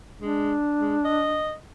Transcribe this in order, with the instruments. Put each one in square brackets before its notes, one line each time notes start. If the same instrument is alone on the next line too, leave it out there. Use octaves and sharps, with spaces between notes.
[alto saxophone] G#3 [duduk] D4
[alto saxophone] G#3
D#5